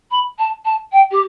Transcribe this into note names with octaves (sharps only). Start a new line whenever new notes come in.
B5
A5
A5
G5
G4